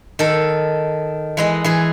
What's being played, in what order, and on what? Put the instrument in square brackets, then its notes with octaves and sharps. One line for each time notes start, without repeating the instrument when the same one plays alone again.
[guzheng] D#3 A4
E3 G#3 D#5
E3 G#4